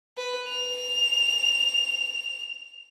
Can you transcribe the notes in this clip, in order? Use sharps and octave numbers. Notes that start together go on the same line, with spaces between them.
B4
F7